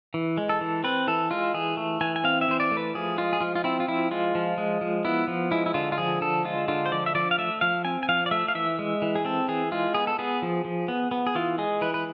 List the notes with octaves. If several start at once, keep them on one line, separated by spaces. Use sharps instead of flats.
E3
G#3
A4
E3
C4 B4
E3 A4
G#3 F4
E3 G#4
A3
E3 G#5
G#5
C4 F5
E5
E3 C5
D5
A3
B4
F3 G#4
G#3 F4
G#4
F3 F4
F4
C4 E4
F4
F3 E4
G#3 F4
F3
G#3
F3
B3 E4
F3
G#3 E4
E4
D3 F4
F4
F3 G#4
D3 A4
G#3 F4
D3 F4
C5
F3 D5
E5
F3 D5
F5
A3 E5
F3 F5
C4 G#5
G#5
F3 F5
D5
A3 E5
F5
E3 E5
G#3
E3
G#4
C4 A4
E3 G#4
G#3 F4
B3 G#4
A4
B3 G#4
F3
F3
B3
B3
G#4
E3 F4
G#3 G#4
E3 B4
B4